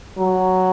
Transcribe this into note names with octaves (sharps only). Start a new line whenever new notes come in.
F#3